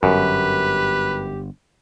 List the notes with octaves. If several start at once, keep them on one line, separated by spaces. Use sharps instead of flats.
G1 F#2 G4 B4